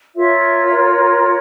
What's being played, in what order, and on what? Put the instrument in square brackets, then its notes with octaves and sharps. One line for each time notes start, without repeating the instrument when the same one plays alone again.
[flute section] F4 A#4 C#5 E5